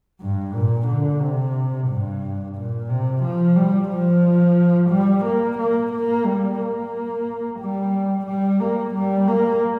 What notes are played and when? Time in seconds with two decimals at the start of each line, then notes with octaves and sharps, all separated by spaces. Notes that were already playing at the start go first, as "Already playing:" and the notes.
0.21 G2
0.54 A#2
0.87 D3
1.21 C3
1.88 G2
2.56 A#2
2.89 C3
3.23 F3
3.56 G3
3.90 F3
4.90 G3
5.25 A#3
5.58 A#3
5.92 A#3
6.25 G3
6.59 A#3
7.60 G3
8.26 G3
8.60 A#3
8.95 G3
9.28 A#3